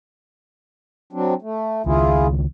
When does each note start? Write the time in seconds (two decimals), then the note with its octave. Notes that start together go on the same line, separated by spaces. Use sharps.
1.13 F#3 C4 D4
1.42 A3
1.86 C#2 D#3 E4 F4 G#4